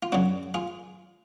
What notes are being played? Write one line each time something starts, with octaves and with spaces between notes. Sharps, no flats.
F4
F#2 C#3 F#3 D4 F#4
F4 G#4